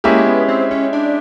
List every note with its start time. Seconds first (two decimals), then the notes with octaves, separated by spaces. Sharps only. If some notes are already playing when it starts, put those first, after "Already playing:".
0.04 G#3 A#3 C#4 E4 G4
0.27 B3
0.48 C4
0.71 C#4
0.93 D4